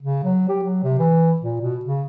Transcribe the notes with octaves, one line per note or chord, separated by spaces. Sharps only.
C#3
F#3
G4
F#3
C3
E3
A#2
B2
C#3